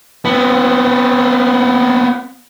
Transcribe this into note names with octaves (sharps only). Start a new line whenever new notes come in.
B3 C4